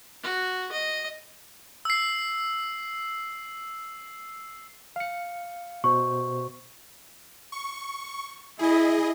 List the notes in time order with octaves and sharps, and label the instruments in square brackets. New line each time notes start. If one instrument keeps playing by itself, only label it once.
[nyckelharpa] F#4
D#5
[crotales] E6 C7
[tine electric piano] F5 C#7
[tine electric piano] B2 C5 [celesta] C#6
[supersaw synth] C#6
[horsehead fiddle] E4 [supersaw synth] G#4 D#5